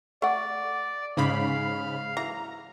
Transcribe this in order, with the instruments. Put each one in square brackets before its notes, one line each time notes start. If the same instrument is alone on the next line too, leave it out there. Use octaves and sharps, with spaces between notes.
[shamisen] A3 F#5 [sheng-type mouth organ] D5
[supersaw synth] G#2 C#3 B5 [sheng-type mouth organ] F5
[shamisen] E3 F#3 [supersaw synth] A#5